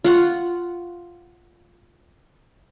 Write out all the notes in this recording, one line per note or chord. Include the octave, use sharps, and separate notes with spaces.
F4 F#5 C#6